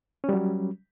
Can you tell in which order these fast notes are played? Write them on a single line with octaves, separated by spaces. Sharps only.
C#4 G3 F#3